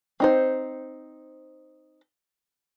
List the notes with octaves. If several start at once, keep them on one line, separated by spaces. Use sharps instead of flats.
C4 D#4 C5